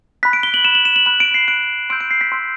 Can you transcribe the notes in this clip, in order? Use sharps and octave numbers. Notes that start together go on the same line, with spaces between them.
B5 F#6 B6
D7
G7
F#7
B5 F#6 E7
F#7
E7
F#7
B5 F#6 E7
D7
C7
B5 F#6 D7
C6 E6 G6 D7
D7
C7
B6
C6 E6 G6